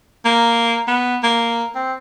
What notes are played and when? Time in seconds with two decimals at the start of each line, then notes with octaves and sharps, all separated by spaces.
0.25 A#3
0.87 B3
1.23 A#3
1.75 C4